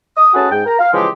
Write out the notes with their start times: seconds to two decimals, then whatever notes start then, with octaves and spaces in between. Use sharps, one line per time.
0.17 D#6
0.34 A3 C#4 F#4 G#4 B4 A5
0.51 G#2 G5
0.66 A#4 A#5
0.79 F5
0.93 C#3 E3 F3 G#3 G4